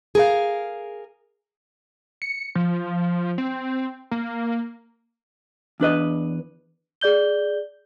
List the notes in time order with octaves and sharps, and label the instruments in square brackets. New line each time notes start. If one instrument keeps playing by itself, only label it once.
[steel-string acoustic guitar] G#4 A#4 F5
[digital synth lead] C#7
F3
C4
A#3
[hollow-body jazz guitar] E2 D4 B4 D#5
[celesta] G#4 D5 G6 G7